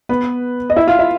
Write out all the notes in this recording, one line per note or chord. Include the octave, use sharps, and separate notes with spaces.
B3 B4
D#5
E4 E5
F4 F5
E4 E5